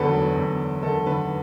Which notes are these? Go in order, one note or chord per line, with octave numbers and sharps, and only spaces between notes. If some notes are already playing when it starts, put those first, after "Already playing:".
Already playing: E2 D3 F#3 A4 B4
F#3
E2
F#3
D3 A4
D3 B4